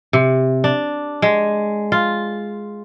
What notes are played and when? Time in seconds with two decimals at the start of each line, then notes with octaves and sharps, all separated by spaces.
0.13 C3
0.64 D4
1.22 G#3
1.92 F4